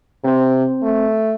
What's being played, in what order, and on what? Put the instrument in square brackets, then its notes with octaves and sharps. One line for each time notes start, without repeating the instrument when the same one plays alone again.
[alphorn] C3 [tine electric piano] C4 C5
[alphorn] A3